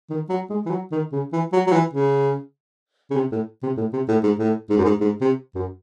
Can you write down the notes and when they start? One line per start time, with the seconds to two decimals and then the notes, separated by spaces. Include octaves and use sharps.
0.10 D#3
0.29 F#3
0.50 G#3
0.66 E3
0.70 F#3
0.92 D#3
1.12 C#3
1.33 E3
1.53 F#3
1.67 F#3
1.73 E3
1.93 C#3
3.11 C#3
3.16 C3
3.32 A2
3.63 C3
3.77 A2
3.93 C3
4.08 A2
4.23 G#2
4.39 A2
4.70 G#2
4.78 F#2
4.85 G#2
5.01 G#2
5.21 C3
5.55 F#2